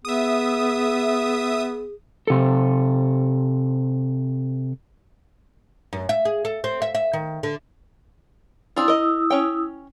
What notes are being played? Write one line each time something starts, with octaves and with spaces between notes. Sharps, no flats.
B3 G#4 E5 D#6
C3 A4
F#2
E5
G#4
A4
C4
E5
E5
D#3
D3
C4 D4 E4 F4 D#6 E6
A#4 D#5
C#4 C#5 G5